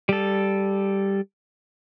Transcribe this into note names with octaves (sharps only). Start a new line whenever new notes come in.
G3 A4